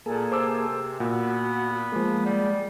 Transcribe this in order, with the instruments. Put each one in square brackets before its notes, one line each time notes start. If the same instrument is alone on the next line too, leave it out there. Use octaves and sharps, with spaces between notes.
[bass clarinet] A#2 [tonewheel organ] A#3 G#4 A4
[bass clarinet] C3 [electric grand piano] C5 D6 E6
[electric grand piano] A#2 [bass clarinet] B3 [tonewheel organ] F#4
[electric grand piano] F3 A#3 [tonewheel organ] G#3
[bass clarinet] G3